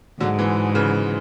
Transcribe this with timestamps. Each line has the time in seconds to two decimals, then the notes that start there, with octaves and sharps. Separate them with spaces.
0.20 G#2 D3 F#3
0.39 E3 G#3
0.75 C#3 E3